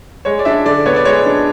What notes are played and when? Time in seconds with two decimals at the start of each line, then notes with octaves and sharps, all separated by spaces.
0.25 G#3 C#5
0.39 D5
0.45 D4 E5
0.65 D3 D5
0.86 B3 C#5
0.96 D5
1.05 G#3 C#5
1.26 D4